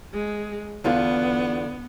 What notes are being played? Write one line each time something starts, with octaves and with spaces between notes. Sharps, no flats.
G#3
E2 D3 B3 F4